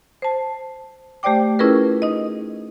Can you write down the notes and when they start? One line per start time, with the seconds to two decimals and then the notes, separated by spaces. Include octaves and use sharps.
0.22 C5 A5
1.23 A3 G4 C5 D5 G5 D6
1.59 C#4 E4 F4 G#4 A#4 B4
2.02 D#4 D#5